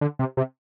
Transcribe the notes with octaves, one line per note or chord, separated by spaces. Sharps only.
D3
C3
C3